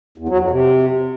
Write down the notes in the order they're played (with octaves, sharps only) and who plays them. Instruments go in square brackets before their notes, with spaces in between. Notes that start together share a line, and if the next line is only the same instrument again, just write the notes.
[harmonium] E2
F#3
F2
C3